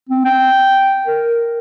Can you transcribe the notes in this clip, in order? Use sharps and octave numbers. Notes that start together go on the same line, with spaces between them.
C4
G5
A#4